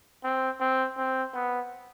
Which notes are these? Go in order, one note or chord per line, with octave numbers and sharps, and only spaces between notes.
C4
C4
C4
B3